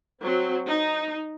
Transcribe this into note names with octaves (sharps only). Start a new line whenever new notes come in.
F#3 C4
D#4